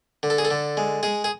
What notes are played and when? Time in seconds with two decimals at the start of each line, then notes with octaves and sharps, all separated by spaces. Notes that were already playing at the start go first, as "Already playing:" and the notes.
0.23 D3
0.30 A4
0.38 G#4
0.45 A4
0.51 D3
0.77 G#3
1.03 G#3 G#4
1.24 G#4